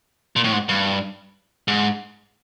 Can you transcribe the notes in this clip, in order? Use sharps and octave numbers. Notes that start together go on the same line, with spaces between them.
A#2
A2
G#2
G2
G#2